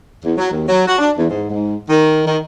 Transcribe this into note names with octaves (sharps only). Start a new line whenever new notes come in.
E2
F#3
D#2
F#3
F#4
D4
E2
G#2
G#2
D#3
D#3